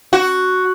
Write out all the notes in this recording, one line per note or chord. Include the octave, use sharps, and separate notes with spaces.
F#4